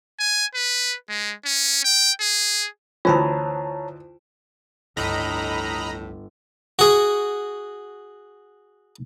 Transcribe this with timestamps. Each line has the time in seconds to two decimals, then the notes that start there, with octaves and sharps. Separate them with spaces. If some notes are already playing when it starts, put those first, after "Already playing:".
0.19 G#5
0.55 B4
1.09 G#3
1.46 C#4
1.84 G5
2.20 G#4
3.05 D2 E3 F4 C5 C#5 A5 A#5
4.97 G1 C#2 A2 F3 D#5 A#5 B5 A#6
6.79 F#4 G#4